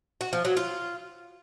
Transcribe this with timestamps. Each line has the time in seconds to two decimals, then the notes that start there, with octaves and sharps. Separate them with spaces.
0.21 F#4
0.33 F3
0.45 F#3
0.57 F4